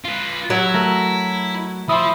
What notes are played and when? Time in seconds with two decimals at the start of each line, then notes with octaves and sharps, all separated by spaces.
0.04 F4 B4
0.50 F#3 E4
0.74 A3 A#4
1.89 F3 E4 C6 D#6